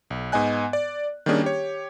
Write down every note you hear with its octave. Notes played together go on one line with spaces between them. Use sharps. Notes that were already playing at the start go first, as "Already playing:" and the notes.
B1
G#2 B3 D#5 G#5 F#6
D5
D#3 G3 A#3 C#4 D4 G#4
G4 C#5